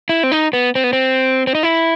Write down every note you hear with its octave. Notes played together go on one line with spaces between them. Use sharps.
E4
C4
D#4
B3
C4
B3
C4
C4
D#4
E4